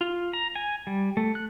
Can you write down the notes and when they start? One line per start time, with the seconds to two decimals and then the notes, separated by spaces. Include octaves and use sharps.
0.01 F4
0.33 A#5
0.56 G#5
0.87 G3
1.17 A3
1.35 F#6